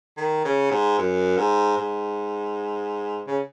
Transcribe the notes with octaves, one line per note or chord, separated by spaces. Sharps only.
D#3
C#3
G#2
F#2
G#2
G#2
C#3